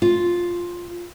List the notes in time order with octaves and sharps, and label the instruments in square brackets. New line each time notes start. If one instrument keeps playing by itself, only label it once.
[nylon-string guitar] F4